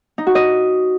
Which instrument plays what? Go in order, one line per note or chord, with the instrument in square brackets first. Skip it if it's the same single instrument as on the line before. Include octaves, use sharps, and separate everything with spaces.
[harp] D#4
F#4
D#5